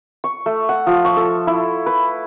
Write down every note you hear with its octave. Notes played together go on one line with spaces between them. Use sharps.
C#6
A3
F#5
F3
C#6
A4
E4
B4